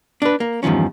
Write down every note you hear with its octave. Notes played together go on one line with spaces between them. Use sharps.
D4 B4
A#3
E2 G2 D#3 F3 C#4